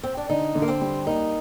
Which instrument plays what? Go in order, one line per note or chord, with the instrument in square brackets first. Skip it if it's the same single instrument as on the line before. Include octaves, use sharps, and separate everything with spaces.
[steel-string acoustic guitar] C4
D4
[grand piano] D3 [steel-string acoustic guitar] D#4
[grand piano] D3
[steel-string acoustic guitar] A#3
C4
[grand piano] G3
[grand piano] A#3 [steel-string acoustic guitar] D#4